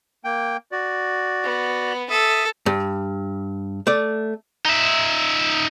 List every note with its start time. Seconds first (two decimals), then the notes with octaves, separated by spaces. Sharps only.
0.24 A#3 G5
0.72 F#4 D5
1.43 B3
2.10 A4 E5 D#6
2.66 G2
3.87 A3 D5
4.65 D#4 E5